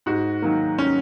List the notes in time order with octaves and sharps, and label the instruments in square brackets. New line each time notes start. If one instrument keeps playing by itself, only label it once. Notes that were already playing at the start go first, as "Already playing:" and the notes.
[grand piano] G#2 F#4
D#3 F#3 A#3
C#4